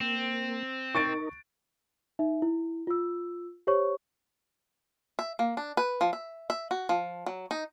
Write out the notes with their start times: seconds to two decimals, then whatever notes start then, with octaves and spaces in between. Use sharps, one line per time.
0.01 A#3 C4
0.95 D#4 A#4 C#6 A6 D7
2.19 D#4 E5
2.42 E4
2.87 F4 E6
3.67 G4 C5 C#5 C#6
5.19 E5
5.39 A#3
5.57 D4
5.77 B4
6.01 F3
6.13 E5
6.50 E5
6.71 F#4
6.89 F3
7.26 F#3
7.51 D#4